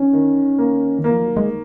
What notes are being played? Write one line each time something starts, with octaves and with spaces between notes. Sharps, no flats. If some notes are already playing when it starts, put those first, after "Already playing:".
Already playing: D#3 C#4
D#3
A#3
D#3
A#3
F3
F#3
G#3